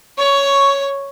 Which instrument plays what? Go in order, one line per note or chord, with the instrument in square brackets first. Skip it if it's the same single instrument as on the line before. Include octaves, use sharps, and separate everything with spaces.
[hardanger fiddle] C#5 [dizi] C#6